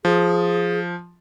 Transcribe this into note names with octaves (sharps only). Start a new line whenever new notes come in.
F3 G#4